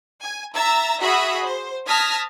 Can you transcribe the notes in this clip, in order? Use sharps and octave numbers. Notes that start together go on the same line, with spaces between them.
G#5
E5 A#5 E6 A6
F#4 G#4 E5 B5 D#6
C5
A5 D#6 F6 G#6 A#6 B6